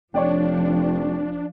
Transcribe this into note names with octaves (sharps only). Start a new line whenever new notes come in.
F1 F3 D4 C#5 D5 G5